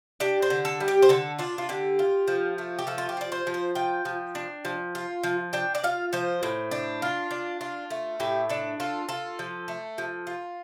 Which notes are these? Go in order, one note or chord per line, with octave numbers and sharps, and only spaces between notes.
D4 G4
C5
D3
A4
G3
G4
C5
D3 A4
D4 F4
F4
D3 G4
F4
F3
A3
G4
F3 A4
F4
G4
F4 D5
C5
F3
C5
F4 G5
F3
D4
F3
F4
F3
D4 G5
D5
F4 F5
F3 C5
A2
D4
F4
D4
F4
A3
A2 G4
D4 A4
F4 A4
F4 A4
F3
A3
F3
F4